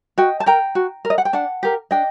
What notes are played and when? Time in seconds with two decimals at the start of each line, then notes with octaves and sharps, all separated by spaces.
0.18 F#4 D#5 G5
0.40 A5
0.46 A#4 G5 A#5
0.75 F#4
1.05 A#4
1.10 D#5
1.18 F#5
1.25 G5
1.33 D4 F#5 A5
1.63 G4 A#4
1.91 D4 D#5 G5